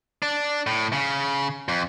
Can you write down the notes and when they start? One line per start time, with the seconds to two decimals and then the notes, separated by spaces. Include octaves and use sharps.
0.22 D4
0.67 A2
0.93 C#3
1.68 F2